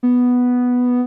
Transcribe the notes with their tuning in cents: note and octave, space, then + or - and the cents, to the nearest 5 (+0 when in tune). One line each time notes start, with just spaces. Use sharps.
B3 +0